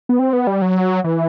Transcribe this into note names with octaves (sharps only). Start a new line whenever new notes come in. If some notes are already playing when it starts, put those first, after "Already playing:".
B3
C4
B3
G3
F#3
E3